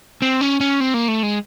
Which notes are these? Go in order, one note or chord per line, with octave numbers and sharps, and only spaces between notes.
C4
C#4
C#4
C4
A#3
A3
G#3